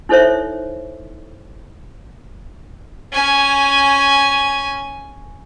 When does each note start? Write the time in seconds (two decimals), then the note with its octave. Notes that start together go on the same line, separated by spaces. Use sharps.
0.09 D#4 E4 A4 C5 C#5 E5
3.12 C#4 G#5